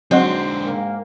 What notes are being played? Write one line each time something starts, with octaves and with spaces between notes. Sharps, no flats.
D3 F#3 G#3 C4 D#4 F#4
G#2 A#3